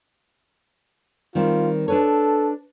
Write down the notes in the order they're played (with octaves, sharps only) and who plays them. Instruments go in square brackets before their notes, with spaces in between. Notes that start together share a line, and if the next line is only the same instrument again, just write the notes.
[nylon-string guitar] D#3 G3 C4 [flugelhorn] F4
[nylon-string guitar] D4 B4 C#5 [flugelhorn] A4